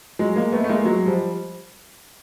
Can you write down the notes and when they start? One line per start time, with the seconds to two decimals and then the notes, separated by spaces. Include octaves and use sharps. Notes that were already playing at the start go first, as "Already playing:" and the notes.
0.19 F#3 G#3
0.36 G#3 A#3
0.52 A3 B3
0.64 A3
0.69 G#3 A#3
0.84 F#3 G#3
1.06 F3 G3